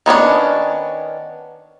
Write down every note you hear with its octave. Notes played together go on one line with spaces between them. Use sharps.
D#3 B3 C#4 D4